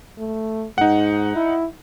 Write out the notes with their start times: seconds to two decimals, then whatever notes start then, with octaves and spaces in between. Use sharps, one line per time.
0.18 A3
0.78 G#2 D#4 F#5
1.36 E4